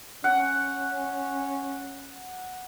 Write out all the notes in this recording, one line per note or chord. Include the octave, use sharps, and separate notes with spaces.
C#4 F#5